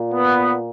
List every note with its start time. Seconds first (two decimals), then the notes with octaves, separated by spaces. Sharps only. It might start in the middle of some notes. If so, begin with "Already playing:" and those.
Already playing: A#2
0.13 B3